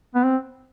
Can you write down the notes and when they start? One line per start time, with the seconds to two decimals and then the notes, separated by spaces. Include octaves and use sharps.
0.15 B3
0.24 C4